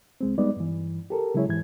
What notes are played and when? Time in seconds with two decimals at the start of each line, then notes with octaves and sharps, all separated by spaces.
0.21 C2 G#3 C4
0.38 G3 G#3 B3 D#4 D5
0.57 G2 E3
1.10 G4 A4 A#4
1.34 C#3 F#3 G#3 E4 G#4 C#5
1.48 G#2 E3 G#6